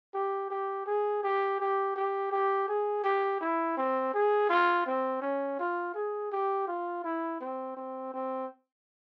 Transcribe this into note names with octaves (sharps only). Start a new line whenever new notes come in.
G4
G4
G#4
G4
G4
G4
G4
G#4
G4
E4
C4
G#4
F4
C4
C#4
F4
G#4
G4
F4
E4
C4
C4
C4